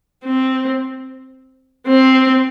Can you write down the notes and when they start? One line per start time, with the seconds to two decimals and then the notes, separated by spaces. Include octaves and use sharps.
0.25 C4
1.88 C4